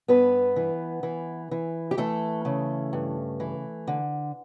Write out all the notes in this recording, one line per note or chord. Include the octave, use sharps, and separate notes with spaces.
G2 B3 B4
E3
E3
E3
G4
E3 A3 A4
C#3
G2
E3
D3